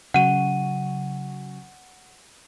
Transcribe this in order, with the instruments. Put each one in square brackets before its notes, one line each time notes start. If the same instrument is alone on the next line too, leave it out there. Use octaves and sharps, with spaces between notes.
[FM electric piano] C#3 F#3 [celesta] F#5 D#7